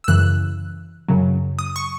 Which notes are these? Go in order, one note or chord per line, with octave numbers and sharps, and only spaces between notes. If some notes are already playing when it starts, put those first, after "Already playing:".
E6
F#2 C#3 E3 F#6
F#2 C#3 F#3
D#6
C#6